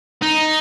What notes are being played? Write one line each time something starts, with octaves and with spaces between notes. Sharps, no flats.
D#4